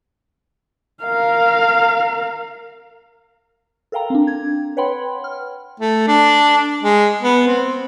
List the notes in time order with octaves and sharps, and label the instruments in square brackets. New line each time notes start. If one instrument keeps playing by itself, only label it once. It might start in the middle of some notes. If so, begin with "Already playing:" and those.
[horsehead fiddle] A#4 F5
[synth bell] A4 A#4 F5 G5 A#5
C4 D4
G#6
B4 C#5 F#5 G5 B5 C6
F6
[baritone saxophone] A3
D4
G#3
B3
C4